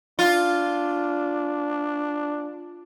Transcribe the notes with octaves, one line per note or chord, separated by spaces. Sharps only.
D4 F4